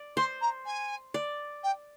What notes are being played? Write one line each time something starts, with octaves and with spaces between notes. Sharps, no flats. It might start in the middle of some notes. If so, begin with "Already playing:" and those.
Already playing: D5
C5 C6
A#5
G#5
D5
G5